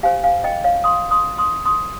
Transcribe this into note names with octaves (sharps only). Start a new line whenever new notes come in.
G4 C5 F5 G#5
F5 G#5
D#5 G5
C#5 F5
C6 D#6
C6 D#6
C6 D#6
C6 D#6